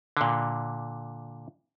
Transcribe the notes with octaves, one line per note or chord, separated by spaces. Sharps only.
A#2 D3